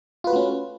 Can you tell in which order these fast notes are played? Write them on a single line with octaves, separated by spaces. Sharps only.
F4 B4 F#4 A3 C#4